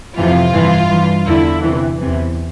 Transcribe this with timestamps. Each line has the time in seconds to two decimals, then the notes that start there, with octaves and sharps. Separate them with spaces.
0.16 F2 C3 E3 F4
0.54 G2 E3
0.91 G2 E3
1.27 E2 D3 E4
1.63 E2 C3 E3
2.00 E2 C3 E3